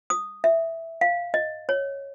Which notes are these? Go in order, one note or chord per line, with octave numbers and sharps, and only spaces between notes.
D#6
E5
F5
D#5
C#5